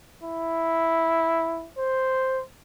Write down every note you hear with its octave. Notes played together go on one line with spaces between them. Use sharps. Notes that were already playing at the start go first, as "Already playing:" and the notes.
E4
C5